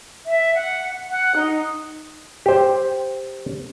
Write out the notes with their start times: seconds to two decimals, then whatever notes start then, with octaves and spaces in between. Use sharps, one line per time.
0.25 E5
0.53 F#5
1.10 F#5
1.34 D#4
2.46 G4 C5